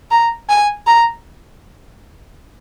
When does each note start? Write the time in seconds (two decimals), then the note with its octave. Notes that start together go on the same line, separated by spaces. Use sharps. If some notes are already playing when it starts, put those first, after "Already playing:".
0.11 A#5
0.49 G#5
0.87 A#5